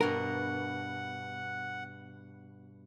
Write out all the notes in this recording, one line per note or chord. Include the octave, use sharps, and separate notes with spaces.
G2 B2 A#4 F#5